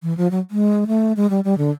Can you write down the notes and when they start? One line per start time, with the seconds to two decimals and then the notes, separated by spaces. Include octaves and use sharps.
0.03 E3
0.17 F3
0.31 F#3
0.51 G#3
0.87 A3
1.16 G#3
1.30 G3
1.44 G3
1.58 D3